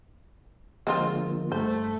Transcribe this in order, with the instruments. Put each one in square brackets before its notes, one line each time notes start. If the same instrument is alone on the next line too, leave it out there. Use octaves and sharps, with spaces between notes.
[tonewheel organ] D3 F3 A#3 [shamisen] G#3 C4 F4
[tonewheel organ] G2 [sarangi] A3 [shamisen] C5